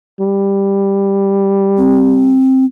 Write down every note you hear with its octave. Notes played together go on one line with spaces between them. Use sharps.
G3
C4